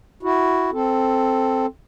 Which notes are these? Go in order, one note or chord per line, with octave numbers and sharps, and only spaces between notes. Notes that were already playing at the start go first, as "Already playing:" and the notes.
E4 F#4
C4 A4